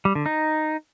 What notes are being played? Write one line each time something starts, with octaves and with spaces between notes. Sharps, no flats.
G3
D3
D#4